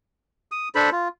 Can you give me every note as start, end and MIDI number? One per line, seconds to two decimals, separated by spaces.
0.52 0.69 87
0.75 0.90 62
0.75 0.90 69
0.75 0.90 72
0.75 0.90 83
0.92 1.08 65